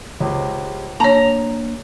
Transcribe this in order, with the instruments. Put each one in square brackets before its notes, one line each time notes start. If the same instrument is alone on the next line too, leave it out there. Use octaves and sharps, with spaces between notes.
[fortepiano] C#2 [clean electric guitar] G4 G#4 C5
[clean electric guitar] A#3 D4 [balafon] C#5 A5 [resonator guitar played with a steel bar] A#5